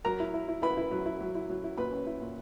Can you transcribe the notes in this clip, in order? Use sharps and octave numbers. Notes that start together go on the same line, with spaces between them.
F#3 A#4 A#5
E4
E4
E4
E4 B4 B5
E4
F#3
E4
F#3
E4
F#3
E4
A#2 B4 B5
C#4
E4
A#2